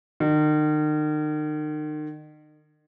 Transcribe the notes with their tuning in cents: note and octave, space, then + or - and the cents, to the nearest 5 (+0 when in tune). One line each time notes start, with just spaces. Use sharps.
D#3 -40